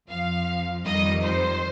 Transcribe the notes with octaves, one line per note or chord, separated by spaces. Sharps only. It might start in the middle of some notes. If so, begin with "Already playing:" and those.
F2 F3 F5
F2 D#3 G3 D#5
C5